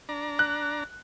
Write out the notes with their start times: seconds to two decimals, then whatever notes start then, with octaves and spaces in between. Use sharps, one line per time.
0.09 D4 A#5
0.39 F#6